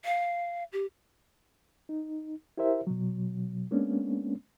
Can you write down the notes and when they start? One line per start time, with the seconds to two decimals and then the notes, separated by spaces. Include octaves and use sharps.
0.05 F5
0.72 G4
1.89 D#4
2.58 E4 G4 A#4 C5 E5
2.87 B2 F#3
3.71 G#3 A#3 B3 C#4 D4